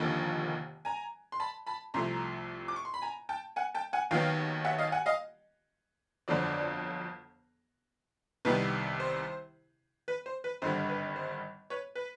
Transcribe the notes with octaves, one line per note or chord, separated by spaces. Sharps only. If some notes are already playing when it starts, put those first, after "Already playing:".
Already playing: F1 D#2 D3 F3 A#3
G#5 A#5
C6
A5 B5
A5 B5
C2 C3 F3 A3 A#5 C6
D6
C#6
C6
B5
G#5 A#5
G5 A5
F#5 G#5
G5 A5
F#5 G#5
D#2 D#3 F#3 B3 F5 G5
E5 F#5
D#5 F5
F#5 G#5
D#5 F5
G1 F2 D3 F#3 C5 D5
C2 C3 D#3 G3 B3 B4
C5
B4
C5
B4
G#1 G2 D3 G3 C5
B4
C5
B4 C#5
B4